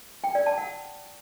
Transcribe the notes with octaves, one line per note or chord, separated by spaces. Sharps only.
G5
D5
A5
F#5